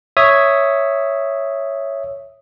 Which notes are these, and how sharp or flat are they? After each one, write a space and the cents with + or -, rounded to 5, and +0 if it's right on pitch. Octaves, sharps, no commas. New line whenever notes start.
C#5 +0 E5 +0 D#6 +0